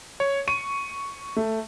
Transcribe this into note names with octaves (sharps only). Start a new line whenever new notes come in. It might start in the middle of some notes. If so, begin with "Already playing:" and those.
C#5
C#6 D#7
A3